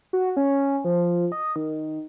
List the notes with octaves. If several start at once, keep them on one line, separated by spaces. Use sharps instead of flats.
F#4
C#4
F3
D#5
D#3